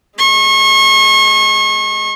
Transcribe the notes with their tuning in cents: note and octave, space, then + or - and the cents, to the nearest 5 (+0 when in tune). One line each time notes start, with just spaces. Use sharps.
G#3 +0 C#6 -35